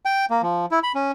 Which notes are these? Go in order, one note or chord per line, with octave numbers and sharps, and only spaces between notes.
G5
A#3
F3
E4
B5
C#4